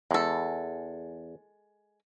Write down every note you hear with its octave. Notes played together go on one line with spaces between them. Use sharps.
E2 G#3 A4